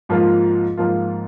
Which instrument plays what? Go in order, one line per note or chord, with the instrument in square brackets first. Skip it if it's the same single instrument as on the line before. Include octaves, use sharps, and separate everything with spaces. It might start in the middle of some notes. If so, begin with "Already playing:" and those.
[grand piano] G#2 F3 A#3 F4
G#2 F3 A#3 F4